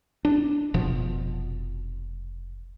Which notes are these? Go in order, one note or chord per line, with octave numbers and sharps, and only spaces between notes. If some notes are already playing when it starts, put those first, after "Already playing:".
D4
F1 B2 F3